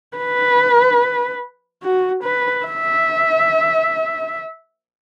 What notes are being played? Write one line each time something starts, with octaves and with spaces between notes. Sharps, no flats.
B4
F#4
B4
E5